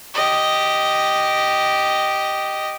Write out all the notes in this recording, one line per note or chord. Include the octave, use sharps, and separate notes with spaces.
G4 D#5